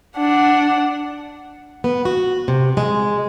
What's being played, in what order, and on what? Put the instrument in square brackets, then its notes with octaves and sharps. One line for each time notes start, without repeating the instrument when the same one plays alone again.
[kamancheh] D4 F#5
[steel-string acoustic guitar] B3
F#4
C3
G#3